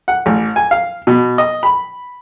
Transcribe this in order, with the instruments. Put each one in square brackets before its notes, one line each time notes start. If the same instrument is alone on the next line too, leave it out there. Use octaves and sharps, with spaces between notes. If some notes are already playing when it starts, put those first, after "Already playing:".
[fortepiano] F#5
A1
G#5
F5
B2
D#5
B5